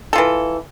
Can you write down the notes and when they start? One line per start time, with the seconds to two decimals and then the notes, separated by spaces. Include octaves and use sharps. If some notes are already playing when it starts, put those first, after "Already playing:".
0.13 A4
0.15 F4
0.18 E3